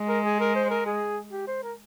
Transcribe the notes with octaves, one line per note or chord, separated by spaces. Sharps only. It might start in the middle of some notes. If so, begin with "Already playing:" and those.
Already playing: G#3
A#4
G#4
A#4
C5
A#4
G#4
G4
C5
A#4